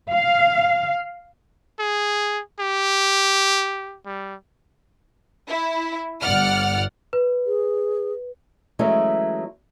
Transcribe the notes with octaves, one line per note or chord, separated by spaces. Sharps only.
F5
G#4
G4
G3
E4
G1 D5 F#5 F6
B4
G#4
E3 F#3 G#3 A3 C#4 E4